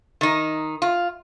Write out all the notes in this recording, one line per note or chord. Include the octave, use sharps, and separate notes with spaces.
D#3 D#4
F4